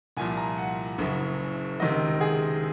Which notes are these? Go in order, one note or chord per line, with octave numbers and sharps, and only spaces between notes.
C2 A#2 F3 G#5
A#5
F#5
F#1 F#2 C#3
C#2 C3 D#3 D#5
G#4